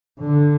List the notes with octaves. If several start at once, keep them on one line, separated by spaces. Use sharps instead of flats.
D3